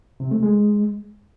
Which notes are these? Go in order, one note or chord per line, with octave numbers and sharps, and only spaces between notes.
C3
A3
G#3